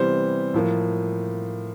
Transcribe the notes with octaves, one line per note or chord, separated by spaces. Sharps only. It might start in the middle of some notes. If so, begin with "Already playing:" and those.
Already playing: C3 E3 G3 B3 C5
A2 F3 A#3